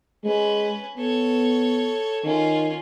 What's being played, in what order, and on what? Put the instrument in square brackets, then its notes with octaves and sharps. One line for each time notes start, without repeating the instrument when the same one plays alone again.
[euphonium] G#3 [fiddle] C#4 B4
[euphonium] B3 [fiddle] A4 C#5
[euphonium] D#3 [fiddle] C#4 F4